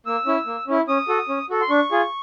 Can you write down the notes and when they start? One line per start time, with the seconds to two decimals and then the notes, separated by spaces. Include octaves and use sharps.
0.06 A#3 E6
0.26 C#4 E4
0.46 A#3
0.67 C#4 E4
0.88 C#4 D#6
1.08 F#4 A4
1.29 C#4
1.50 F#4 A4
1.62 C6
1.70 D4 C#6
1.92 F4 G#4